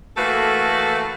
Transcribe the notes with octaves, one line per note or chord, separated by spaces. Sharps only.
E3 A3 A#3 F#4 A4 B4